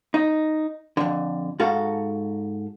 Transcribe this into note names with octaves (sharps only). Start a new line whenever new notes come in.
D#4
F2 D3
G#2 F#4 A4 F5